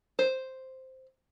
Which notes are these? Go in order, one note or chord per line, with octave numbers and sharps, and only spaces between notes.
C5